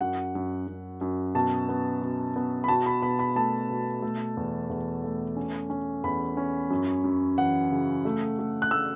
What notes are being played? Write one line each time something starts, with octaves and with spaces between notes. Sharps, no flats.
F#2 F#5
F#2
F#2
F#2
B2 A5
B3
B2
B3
B5
B2 A5
B5
B2 B5
B5
A3 A5
B2
A3
E2
E2
A3
C#4
C#4
E2 B5
C#4
F#2
F#2
E3 F#5
C#3
A3
A3
F#6
A3 E6